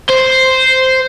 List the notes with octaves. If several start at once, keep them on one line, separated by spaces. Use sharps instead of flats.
C5